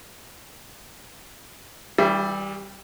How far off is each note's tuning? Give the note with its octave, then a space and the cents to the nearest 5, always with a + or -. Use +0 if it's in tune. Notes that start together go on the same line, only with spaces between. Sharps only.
E3 -40 G3 +0 E5 +25